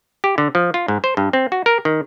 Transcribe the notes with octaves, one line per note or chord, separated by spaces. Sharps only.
G4
D3
F3
F4
G#2
C5
G2
C4
F#4
A#4
D#3